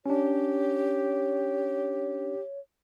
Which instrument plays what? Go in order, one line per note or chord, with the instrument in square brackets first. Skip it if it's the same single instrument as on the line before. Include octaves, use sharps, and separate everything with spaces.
[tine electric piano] C#4 D4 [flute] G4 [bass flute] C#5